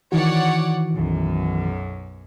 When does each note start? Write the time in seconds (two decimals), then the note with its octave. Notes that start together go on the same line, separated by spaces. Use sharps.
0.12 D#3 E3 F#4 C#5 D5 F#5
0.93 B1 F#2